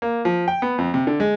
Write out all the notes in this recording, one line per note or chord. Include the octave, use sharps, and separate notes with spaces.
A#3
F3
G5
B3
F2
C3
D3
G#3